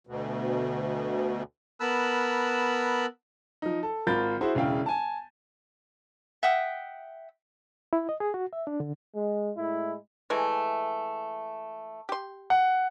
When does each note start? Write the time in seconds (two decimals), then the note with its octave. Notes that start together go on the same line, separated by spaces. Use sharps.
0.07 D2 B2
1.80 B3 A#4 A5 B5 E6 F#6
3.62 F3 D#4
3.83 A4
4.07 G#1 F4 A#4 B5 G6 A6
4.41 E4 F#4 G#4 C5
4.55 E1 C#3 E4 F5 G5
4.86 G#5 A5
6.43 E5 F#5 G5 D#6
7.93 E4
8.09 D#5
8.20 G#4
8.34 F#4
8.53 E5
8.67 D4
8.80 D3
9.15 G#3
9.57 A2 G#3 E4
10.30 E3 G#3 A3
12.09 G4 C6
12.50 F#5